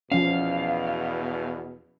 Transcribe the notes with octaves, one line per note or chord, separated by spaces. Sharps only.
E2 B2 F3 C#4 F5